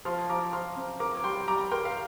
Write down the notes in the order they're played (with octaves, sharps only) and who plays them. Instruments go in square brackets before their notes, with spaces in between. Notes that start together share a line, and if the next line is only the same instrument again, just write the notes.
[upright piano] F3 [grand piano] C6 F6
[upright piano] F3 [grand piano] A#5 D6
[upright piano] F3 [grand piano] C6 F6
[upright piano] C4
[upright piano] A#4 [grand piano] A#5 D6
[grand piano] D6
[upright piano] G3 [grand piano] G5 C6
[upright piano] G3 [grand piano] A#5 D6
[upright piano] A#4 [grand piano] G5 C6
[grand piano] F5